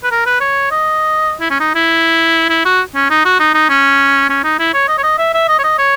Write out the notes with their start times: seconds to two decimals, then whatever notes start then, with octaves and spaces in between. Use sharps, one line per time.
0.04 B4
0.11 A#4
0.26 B4
0.41 C#5
0.71 D#5
1.40 E4
1.50 C#4
1.60 D#4
1.75 E4
2.50 E4
2.65 F#4
2.95 C#4
3.10 D#4
3.25 F#4
3.39 D#4
3.54 D#4
3.69 C#4
4.30 C#4
4.44 D#4
4.59 E4
4.74 C#5
4.88 D#5
4.98 C#5
5.03 D#5
5.18 E5
5.34 E5
5.48 D#5
5.59 C#5
5.64 D#5
5.78 C#5